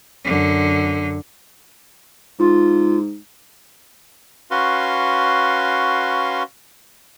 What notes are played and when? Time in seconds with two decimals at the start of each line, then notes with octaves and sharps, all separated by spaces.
0.25 F#2 D3
2.39 G#2 F4
4.51 C#4 F#4 B4 F5 C6